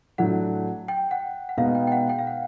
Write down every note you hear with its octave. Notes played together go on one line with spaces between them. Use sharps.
A2 F#3 A3 D4 F#5
G5
F#5
F#5
B2 G#3 B3 D#4 F5
G5
G5
F#5
G5
F5
F#5